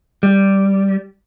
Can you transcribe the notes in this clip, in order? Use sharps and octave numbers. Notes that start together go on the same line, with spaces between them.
G3